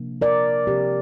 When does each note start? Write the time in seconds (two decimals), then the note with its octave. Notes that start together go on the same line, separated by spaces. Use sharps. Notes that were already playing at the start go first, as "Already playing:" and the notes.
Already playing: C3 F3 A#3 D4
0.21 A#4 D5
0.67 C3 F3 C4 G4